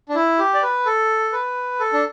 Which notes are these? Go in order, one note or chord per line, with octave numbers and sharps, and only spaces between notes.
D4
E4
G4
D5
B4
A4
B4
A4
D4